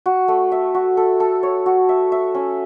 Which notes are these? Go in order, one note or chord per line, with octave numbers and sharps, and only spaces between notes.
F#4
A3
E5
F#4
A4
A4
C#5
F#4
E5
E5
C#4